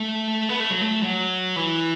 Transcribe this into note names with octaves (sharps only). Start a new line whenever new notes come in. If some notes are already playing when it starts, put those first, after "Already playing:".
Already playing: A3
B3
A3
F#3
A3
F#3
E3